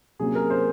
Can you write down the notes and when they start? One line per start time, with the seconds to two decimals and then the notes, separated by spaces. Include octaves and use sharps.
0.19 C3 F#3 A#3 C#4 G#4
0.35 A#4
0.50 C5